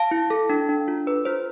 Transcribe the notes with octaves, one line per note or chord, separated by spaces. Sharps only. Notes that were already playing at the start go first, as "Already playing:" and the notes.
Already playing: F5 A5
E4
A4
D4
D4
F4
A4 B4
F4 C5